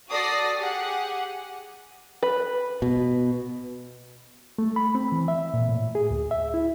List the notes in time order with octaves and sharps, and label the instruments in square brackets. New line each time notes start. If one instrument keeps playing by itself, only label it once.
[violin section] F#4 A4 D5 D#6 A#6 C7
G4 G#4 F#5
[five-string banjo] B4
[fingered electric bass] B2
[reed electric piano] A3
B5
C4
E3
E5
A#2
A2
G#4
D2
E5
E4